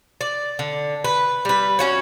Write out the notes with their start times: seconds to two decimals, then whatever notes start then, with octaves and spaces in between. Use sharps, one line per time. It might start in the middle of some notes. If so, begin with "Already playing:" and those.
0.21 D5
0.59 D3
1.04 B4
1.45 G3 B4
1.79 C#4 F#4 C#5